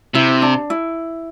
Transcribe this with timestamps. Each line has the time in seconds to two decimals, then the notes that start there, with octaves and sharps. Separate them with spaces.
0.14 C3 E4
0.42 D4
0.70 E4